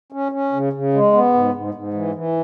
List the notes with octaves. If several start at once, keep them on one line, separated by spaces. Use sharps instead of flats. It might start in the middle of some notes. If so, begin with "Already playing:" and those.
C#4
C#4
C#3
C#3
G#3
B3
G#2
G#2
G#2
E3
E3